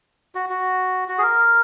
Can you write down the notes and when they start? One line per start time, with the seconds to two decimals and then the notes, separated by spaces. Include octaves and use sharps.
0.35 F#4
0.50 F#4
1.08 F#4
1.18 G#4
1.23 A#4